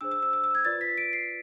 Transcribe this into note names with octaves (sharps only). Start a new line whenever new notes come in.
D4 G#4 C5 E6
E6
E6
E6
E6
G#6
F4 B4 D5 A6
B6
D7
C7